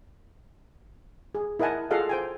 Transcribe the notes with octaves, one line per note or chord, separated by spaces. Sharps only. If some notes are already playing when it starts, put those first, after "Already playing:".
G#4
E4 A#4 D#5 F#5 G#5 A5
F4 G#4 A4 D#5 F5 F#5
C5 G5 G#5